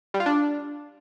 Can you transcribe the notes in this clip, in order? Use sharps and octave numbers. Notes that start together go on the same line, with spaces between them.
G3
F4
D4